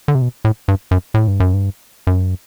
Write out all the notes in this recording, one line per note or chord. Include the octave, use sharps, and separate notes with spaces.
D3
C3
B2
A2
G2
F#2
A2
G2
F#2
G2
F#2